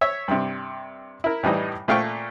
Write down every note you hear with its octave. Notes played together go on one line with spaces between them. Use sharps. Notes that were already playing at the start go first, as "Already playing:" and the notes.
C#5 E5
G2 C3
E4 A#4
A2 E3 G3 D#4
A#2 A3 F5 G5 C#6